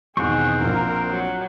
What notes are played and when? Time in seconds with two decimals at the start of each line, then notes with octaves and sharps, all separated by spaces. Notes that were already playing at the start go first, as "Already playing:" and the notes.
0.17 E2 B2 D#3 C4 G#4 F#5 C#6
0.62 A#1 A#2 F3 A#4
1.09 F#3